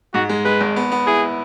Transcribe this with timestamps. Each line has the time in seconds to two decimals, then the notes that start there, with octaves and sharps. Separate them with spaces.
0.14 G#2 F#4
0.29 G#3
0.45 G#3 B4
0.61 G#1
0.76 B3
0.92 B3
1.07 E4 G#4